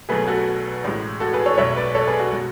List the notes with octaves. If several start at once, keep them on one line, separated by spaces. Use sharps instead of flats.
B1 B2 F#3 A3 G#4 B4
F#4 A4
A1 A2 G#3
F#4 A4
G#4 B4
A4 C#5
B1 B2 G#3 C#5 E5
B4 D5
A4 C#5
G#4 B4
F#4
B2 G#3